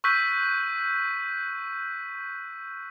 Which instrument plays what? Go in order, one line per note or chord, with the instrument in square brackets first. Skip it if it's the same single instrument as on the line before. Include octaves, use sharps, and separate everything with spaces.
[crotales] C#6 E6 F#6 G6 B6 D#7